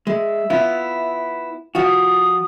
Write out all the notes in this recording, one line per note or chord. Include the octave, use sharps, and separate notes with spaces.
G#3 E5
B3 E4 F4
F3 F4 F#4 D#6